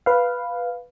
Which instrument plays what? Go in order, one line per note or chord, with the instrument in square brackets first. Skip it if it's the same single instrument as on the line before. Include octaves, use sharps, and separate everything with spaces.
[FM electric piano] B4 F5